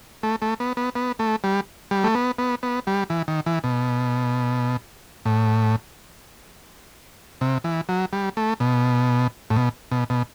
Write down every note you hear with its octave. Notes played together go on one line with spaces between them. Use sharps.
A3
A3
B3
B3
B3
A3
G3
G3
A3
B3
B3
B3
G3
E3
D#3
E3
B2
A2
C3
E3
F#3
G3
A3
B2
A2
B2
B2
B2